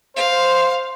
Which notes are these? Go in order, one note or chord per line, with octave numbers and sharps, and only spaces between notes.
C5 F5